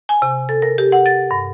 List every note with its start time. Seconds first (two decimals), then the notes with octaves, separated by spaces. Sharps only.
0.09 G#5
0.22 C3
0.49 A4
0.62 A#4
0.78 G4
0.92 F#5
1.06 A6
1.31 G2